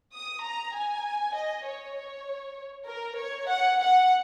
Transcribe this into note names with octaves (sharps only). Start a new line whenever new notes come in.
D#6
A#5
G#5
D#5
C#5
C#5
A#4
C#5
F#5
F#5